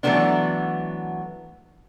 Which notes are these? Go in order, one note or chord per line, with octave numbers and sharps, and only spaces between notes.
E3 F#3 G#3 A3 B3 D4